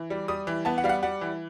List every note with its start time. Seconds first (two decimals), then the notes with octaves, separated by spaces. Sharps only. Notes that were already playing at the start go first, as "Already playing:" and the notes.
Already playing: E3
0.10 G3
0.28 G3 D#6
0.47 E3
0.65 B3 A5
0.78 F#5
0.84 G3 F5
0.89 F#5
1.03 G3 F#5
1.21 E3